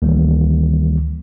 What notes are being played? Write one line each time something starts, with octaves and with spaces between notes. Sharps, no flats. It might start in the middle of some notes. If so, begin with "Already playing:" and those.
D2 D#3 E3 G3 A#3